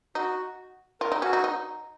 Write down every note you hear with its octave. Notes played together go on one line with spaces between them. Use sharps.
D#4 F#4
F4 A#4
D#4
C#4 F#4
D#4
D#4